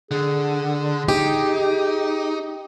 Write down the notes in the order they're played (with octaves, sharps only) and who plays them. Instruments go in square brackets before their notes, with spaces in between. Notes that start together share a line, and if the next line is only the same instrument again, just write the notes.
[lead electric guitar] D3 [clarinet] G#4
[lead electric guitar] D#4 [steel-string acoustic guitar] G4